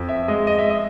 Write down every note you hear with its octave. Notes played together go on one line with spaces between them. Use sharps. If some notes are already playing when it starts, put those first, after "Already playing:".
Already playing: F2
E5
G#3 D#5
D#5
E5
D#5